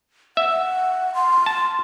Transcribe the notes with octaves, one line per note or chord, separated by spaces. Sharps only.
E5 F#5
C6
A5